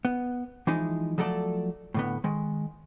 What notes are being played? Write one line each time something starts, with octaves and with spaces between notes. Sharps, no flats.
B3
E3 F3 G#3 D#4 E4
F3 F#3 A3 A4 D5
A2 D3 B3
D#3 G#3